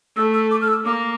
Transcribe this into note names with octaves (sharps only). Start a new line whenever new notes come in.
A3 E6
E6
D6
F6
E6
A#3 D6